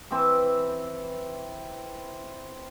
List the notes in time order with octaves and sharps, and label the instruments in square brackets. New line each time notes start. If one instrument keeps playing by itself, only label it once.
[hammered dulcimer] E3 C4 E5 D6